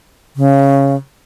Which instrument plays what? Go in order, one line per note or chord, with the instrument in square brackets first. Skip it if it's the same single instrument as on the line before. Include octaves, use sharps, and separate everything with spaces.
[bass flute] C#3